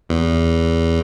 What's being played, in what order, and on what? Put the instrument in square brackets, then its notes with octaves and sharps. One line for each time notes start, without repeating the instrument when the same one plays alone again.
[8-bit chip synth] E2